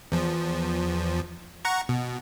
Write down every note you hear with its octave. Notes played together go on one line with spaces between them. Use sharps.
E2 F3
F#5 A#5 C#6
B2